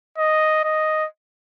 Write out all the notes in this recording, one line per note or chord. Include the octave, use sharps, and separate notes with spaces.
D#5
D#5